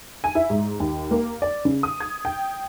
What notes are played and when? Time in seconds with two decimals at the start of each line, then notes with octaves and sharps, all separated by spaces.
0.24 G#5
0.35 E4
0.50 G#2
0.80 D#2
1.11 A#3
1.42 D5
1.65 C#3
1.83 D#6
2.00 G#6
2.25 G5